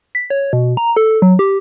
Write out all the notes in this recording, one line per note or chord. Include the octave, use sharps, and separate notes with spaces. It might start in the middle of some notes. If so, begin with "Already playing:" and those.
B6
C#5
B2
A#5
A4
F#3
G4